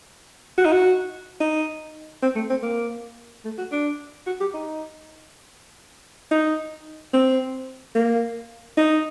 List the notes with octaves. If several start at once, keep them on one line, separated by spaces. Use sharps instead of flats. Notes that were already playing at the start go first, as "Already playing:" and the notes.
F#4
D#4
F#4
D#4
C4
A3
C4
A#3
A3
F#4
D4
F#4
G4
D#4
D#4
C4
A#3
D#4